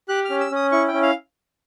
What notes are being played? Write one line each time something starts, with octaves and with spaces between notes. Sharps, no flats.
G4 F#6
F6
C#4
E6
C#4 D#6
E4 C#6
G5
C#4
F5